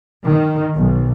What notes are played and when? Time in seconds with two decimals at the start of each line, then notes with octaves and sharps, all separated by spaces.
0.24 D#3
0.75 B1